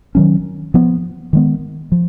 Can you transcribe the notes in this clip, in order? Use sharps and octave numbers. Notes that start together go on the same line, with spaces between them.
D#3 F#3 C#4
F3 B3
D#3 G#3 B3
F3